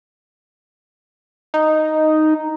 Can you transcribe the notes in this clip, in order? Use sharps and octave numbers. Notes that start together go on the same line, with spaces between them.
D#4